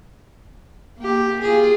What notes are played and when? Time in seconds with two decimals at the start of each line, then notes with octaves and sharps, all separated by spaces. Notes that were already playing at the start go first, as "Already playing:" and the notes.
0.98 A#3 G4
1.42 F4 G#4